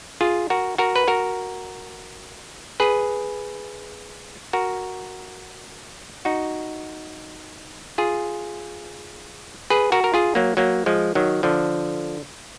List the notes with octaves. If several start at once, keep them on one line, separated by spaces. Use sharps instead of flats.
F4 G#4
F#4 A#4
F#4 A#4
B4
F#4 A#4
G#4 B4
F#4 A#4
D#4 F#4
F4 G#4
G#4 B4
F#4 A#4
A#4
F4 G#4
F#3 A#3
F#3 A#3
F3 G#3
D#3 F#3
D3 F3